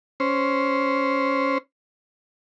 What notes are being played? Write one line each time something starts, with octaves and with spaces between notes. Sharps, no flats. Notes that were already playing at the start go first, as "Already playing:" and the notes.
C#4 C5